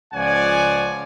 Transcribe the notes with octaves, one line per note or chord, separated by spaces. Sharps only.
C#2 F3 C#5 D5 F#5 G#5